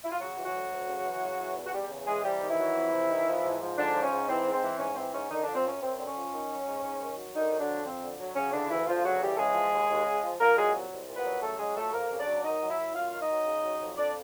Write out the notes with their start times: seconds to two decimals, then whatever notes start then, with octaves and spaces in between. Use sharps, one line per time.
0.04 E4
0.12 F4
0.20 C#3 F#3 F#4
0.37 E3
0.45 F#3 F#4
0.54 D2
0.71 D2
0.88 C#3
1.05 E3
1.22 C#3
1.39 E3
1.57 E2
1.67 F#4
1.73 E2 G3 G4
1.90 C#3
2.07 E3 G#3 G#4
2.24 C3 G3 G4
2.41 D#3
2.50 E3 E4
2.58 F#3
2.76 F2
2.92 C3
3.09 D#3
3.27 F3
3.43 G#2
3.61 F3
3.77 G#2 D3 D4
3.94 F3
4.03 C#4
4.11 G#2
4.28 E3 C4
4.45 G#2
4.53 C4
4.62 E3
4.79 G#2 C#4
4.96 E3 C4
5.13 G#2 C#4
5.30 D3 D#3 D#4
5.43 D3 F3 D4
5.55 C4
5.64 F#2 C#4
5.81 F#2 C4
5.98 D3 C4
6.07 C#4
6.16 F3
6.33 D#3
6.50 F#3
6.67 G#2
6.83 G#2
7.00 D#3
7.17 F#3
7.35 D3 D#3 D#4
7.52 F#3
7.59 D3 D4
7.69 F2
7.85 F2 C4
8.03 D3
8.20 F#3
8.36 C#3 C#4
8.53 D3 E3 D4
8.70 D2 E3 E4
8.87 D2 F3 F4
9.04 C#3 F#3 F#4
9.22 E3 G3 G4
9.34 A4
9.38 C#3 G#3 G#4
9.55 F3
9.72 D#2
9.90 D#2
10.06 C#3
10.23 F3
10.40 A#2 A#3 A#4
10.57 F#3 G#3 G#4
10.75 C2
10.91 C2
11.08 A#2
11.17 B3 B4
11.25 F#3
11.42 C#3 A3 A4
11.59 F#3 G#3 G#4
11.77 F2 A3 A4
11.93 F2 A#3 A#4
12.11 C#3
12.19 D4 D5
12.27 F#3
12.44 D#3 D#4 D#5
12.61 F#3
12.70 E4 E5
12.79 F#2
12.95 F#2 F4 F5
13.12 D#3
13.21 D#4 D#5
13.29 F#3
13.47 C#3
13.64 F#3
13.80 F2
13.97 F2 D4 D5